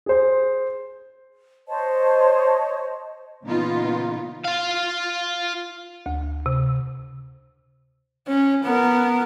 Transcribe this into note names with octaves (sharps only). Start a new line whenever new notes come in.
G#4 C5
C5 C#5 D#5 A5
A#2 C#3 E3 B3 D#4 F4
F4 F5
D2
C3
C#4
B3 A#4